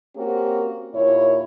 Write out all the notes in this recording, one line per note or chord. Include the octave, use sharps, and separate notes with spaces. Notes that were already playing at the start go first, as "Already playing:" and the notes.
A#3 C4 C#4 F#4 G4 A#4
D#2 A#2 E4 C#5